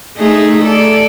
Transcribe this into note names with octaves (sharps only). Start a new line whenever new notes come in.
A3 D#4 G#4
A4 D5